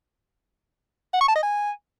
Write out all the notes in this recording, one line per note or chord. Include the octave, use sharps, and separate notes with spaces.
F#5
C#6
A5
D#5
G#5